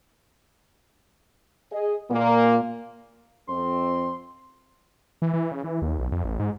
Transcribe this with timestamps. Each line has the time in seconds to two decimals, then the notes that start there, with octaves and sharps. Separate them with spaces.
1.71 G#4 D#5
2.10 A#2 A#3
3.49 F2 C4 C6
5.22 E3
5.33 E3
5.52 C#3
5.64 E3
5.82 D#2
5.99 B1
6.12 F2
6.24 A1
6.40 G#2